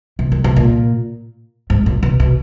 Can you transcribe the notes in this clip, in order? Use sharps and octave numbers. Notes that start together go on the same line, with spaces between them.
B2
D#3
B2
A#2
G#2
A#2
B2
B2